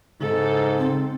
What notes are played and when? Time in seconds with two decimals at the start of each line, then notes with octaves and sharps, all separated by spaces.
0.21 G#2 C#3 A4
0.78 C4